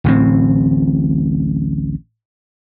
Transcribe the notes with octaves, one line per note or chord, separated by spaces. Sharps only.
D1 A1 A2 C4